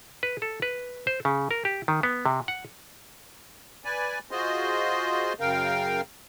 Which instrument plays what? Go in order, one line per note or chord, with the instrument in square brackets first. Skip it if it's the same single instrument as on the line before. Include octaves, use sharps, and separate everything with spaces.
[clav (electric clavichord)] B4
A4
B4
C5
C#3
A#4
G4
D#3
B3
C3
F#5
[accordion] B4 D5 G#5
F4 F#4 G#4 C5 D#5 C6
F#2 C#3 A#4 F5 G5